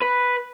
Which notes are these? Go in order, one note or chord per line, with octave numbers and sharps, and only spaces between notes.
B4